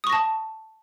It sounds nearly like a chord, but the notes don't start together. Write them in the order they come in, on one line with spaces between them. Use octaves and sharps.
D#6 C#6 A#6 A5